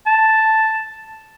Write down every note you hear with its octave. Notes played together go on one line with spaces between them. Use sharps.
A5